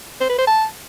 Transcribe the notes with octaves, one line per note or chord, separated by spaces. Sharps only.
C5
B4
C5
A5